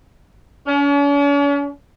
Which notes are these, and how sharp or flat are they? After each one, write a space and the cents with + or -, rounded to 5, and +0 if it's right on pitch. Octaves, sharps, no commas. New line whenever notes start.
C#4 +45